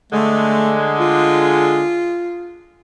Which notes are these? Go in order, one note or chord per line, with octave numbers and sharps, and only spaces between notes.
D3 G#3 A3
F4